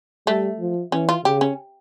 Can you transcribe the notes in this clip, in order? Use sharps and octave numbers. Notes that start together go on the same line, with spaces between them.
G3 A3
F3
E3 C#4
F4
C#3 G4
C#4